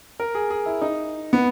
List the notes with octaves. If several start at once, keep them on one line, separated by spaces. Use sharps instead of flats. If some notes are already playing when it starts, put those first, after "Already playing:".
A#4
G#4
G#4
E4
D#4
B3